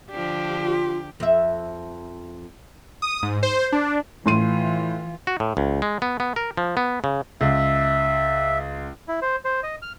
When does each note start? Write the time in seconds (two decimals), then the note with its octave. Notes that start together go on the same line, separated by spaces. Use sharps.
0.11 D3 F3 D4 G4
0.61 F4
1.20 F2 E5
3.02 D#6
3.23 G#2
3.43 C5
3.72 D4
4.26 A2 E3 F4 C6 D#7
5.27 F#4
5.40 A2
5.57 C#2
5.82 G#3
6.02 B3
6.20 B3
6.36 A#4
6.57 F3
6.77 B3
7.04 C#3
7.41 C#2 E5
9.08 E4
9.22 C5
9.45 C5
9.63 D#5
9.82 F6